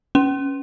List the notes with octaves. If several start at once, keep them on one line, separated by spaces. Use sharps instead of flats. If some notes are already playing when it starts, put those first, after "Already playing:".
C#4